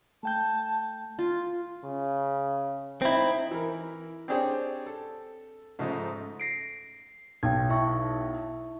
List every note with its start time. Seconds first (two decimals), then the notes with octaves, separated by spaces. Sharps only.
0.23 A3 G5 A5 G6
1.19 F4
1.84 C#3
3.02 C4 D#4 E4
3.51 E3 A#4
4.28 C4 D4 G4 G#4 C5 C#5
4.86 A4
5.79 G#2 C#3 F3 A3 D#4
6.40 A#6 C7 D7
7.43 B1 G5 G#6
7.69 E4 E5 C#6